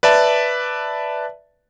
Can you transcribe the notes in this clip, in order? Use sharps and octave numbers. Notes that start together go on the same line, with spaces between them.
B4 D5 E5 A5